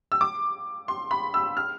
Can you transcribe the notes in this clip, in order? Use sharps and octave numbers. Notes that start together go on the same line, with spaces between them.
E6
D6
C6
B5
E6
F6